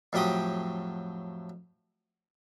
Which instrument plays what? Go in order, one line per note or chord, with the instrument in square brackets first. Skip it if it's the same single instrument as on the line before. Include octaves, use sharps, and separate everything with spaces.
[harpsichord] F2 A2 F#3 G4 G5 D#6